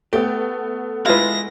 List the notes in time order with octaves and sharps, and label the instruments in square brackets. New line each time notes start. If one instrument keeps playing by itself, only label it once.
[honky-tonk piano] A3 B3 [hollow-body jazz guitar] G4
[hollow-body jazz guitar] G#3 F5 [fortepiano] E4 F4 B4 [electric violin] A#6